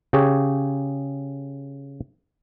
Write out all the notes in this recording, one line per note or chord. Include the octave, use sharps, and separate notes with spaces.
C#3 G4 G#4 C#5